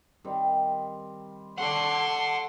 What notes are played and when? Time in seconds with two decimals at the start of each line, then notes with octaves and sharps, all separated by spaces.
0.24 D#3 G3 C4
1.58 A4 D5 F#5 C6 C#6